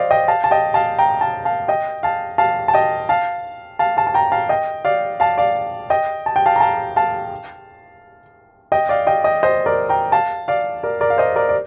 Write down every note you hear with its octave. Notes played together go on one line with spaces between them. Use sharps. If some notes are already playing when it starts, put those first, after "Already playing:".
Already playing: C5 D5 D#5 F5
D#5 G5
F5 A5
A5
D#5 G5
F5 A5
G5 A#5
F5 A5
F5 A5
D#5 G5
F5 A5
F5 A5
A5
D#5 G5
F5 A5
F5 A5
F5 A5
A5
G5 A#5
F5 A5
D#5 G5
D5 F5
F5 A5
D5 F5
D#5 G5
A5
G5
F5 A5
A#5
F5 A5
F5 A5
D#5 G5
D5 F5
D#5 G5
D#5 G5
C5 D#5
A#4 D5
G5 A#5
F5 A5
D5 F5
A#4 D5
A#4 D5
F5
C5 D#5
A#4 D5
D5